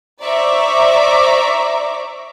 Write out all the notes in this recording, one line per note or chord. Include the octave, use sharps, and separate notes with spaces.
C5 D5 E5 A#5 C#6 D6